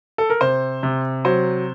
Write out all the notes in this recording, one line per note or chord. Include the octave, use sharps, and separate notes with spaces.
A4
A#4
C3 C5
C3
F#3 C5